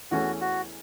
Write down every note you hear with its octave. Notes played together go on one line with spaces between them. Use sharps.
E2 E3 A3 C#4 F#4
F#4